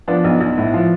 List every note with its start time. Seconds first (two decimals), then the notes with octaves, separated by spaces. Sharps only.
0.08 F3 B3 D4
0.24 B1
0.40 B1
0.58 A2
0.74 F3